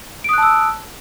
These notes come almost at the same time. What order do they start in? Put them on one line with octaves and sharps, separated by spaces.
D7 D#6 F#6 A5 E6